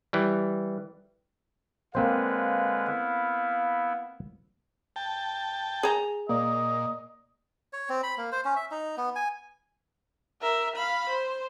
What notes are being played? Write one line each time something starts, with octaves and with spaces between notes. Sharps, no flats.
E3 G3
D3 G#3 A#3 C4 B4 C5 F5
B3 E4
G5 A5
G#4 A#5
A#2 A#3 D5 D#5
C#5
C4
B5
A#3
C5
C#4
E5
D#4
B3
G#5
A#4 E5
F5 B5
C5